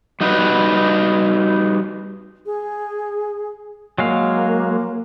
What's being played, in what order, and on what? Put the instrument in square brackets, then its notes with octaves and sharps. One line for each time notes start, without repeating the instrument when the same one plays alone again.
[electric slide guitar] G3 D#4 F#4 B4
[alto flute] G#4
[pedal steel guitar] F#3 G#3 F5 [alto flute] A#3